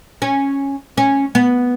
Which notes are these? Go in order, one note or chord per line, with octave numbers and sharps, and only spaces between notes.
C#4
C#4
B3